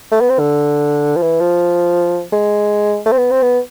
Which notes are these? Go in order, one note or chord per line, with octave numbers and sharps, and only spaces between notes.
A3
B3
C4
D3
F3
E3
F3
G#3
A3
C4
B3
C4
B3